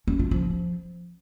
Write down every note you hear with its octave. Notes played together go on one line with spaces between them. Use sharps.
C#4
F4
F3